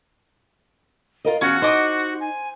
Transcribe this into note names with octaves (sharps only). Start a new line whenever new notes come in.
F4 A#4 D#5
E2 C#4 F4 F#4
D#4 C5 D6 D#6
G#5